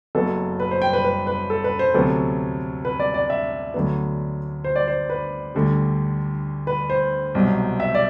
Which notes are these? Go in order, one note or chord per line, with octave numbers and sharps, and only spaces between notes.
F#1 F#2 F#3 B3 A4
B4
C5
G5
B4
B4
B4
A4
B4
C5
D2 C3 F#3 B3 A4
B4
D5
D5
E5
D2 D3 F#3 B3
C5
D5
C5
B4
D2 D3 G3
B4
C5
C2 B2 F#3
E5
D5